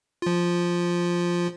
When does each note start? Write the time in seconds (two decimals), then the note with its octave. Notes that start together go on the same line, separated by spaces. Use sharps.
0.22 F3 F4